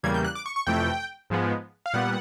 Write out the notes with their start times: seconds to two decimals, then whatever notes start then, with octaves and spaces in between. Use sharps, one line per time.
0.03 E2 C#3 E3 G3 A#3 G#6
0.14 G6
0.25 F#6
0.35 D6
0.46 C#6
0.56 C#6
0.67 F2 C3 E3 A3 G5
1.30 G#2 F3 G#3 B3
1.86 F5
1.94 A#2 G3 B3 F#5